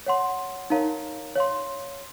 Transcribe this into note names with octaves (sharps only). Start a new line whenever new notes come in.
C#5 F#5 C6
D#4 A#4 C#5 F5 A#5
C#5 F5 C6